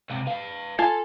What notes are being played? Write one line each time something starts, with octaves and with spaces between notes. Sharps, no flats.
C#2 C3
B4 F5
F4 A4 G#5 A5